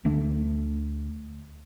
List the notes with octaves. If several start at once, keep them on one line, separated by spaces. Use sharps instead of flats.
D2 D3 A3 D4